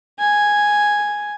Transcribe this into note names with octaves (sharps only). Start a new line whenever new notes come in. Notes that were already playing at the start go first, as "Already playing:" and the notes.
G#5